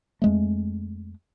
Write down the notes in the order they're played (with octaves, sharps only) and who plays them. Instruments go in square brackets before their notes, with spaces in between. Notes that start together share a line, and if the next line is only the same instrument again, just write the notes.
[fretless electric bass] F2 G#3 A3